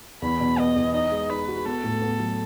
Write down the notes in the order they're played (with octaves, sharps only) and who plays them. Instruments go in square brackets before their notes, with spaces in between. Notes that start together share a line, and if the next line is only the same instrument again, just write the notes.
[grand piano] E2 [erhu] B5
[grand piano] B2
[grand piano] B3 [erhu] D#5
[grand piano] E2
[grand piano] D#4 [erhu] D#5
[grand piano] G#3
[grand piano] D#4 [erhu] B4
[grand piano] F#4
[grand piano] B3 [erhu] A4
[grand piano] A2
B3
F#3